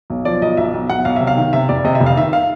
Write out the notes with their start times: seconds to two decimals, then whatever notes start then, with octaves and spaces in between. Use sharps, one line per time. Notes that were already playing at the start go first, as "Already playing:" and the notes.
0.10 B1
0.25 F3 D5
0.42 B1 D#5
0.57 B1 E5
0.74 B1
0.90 B1 F#5
1.05 B1 F5
1.16 C3 E5
1.27 F5
1.37 D#3
1.53 C3 E5
1.69 F1 D5
1.84 C3 D#5
1.95 E5
2.00 F1
2.06 F5
2.17 D#3 E5
2.33 F5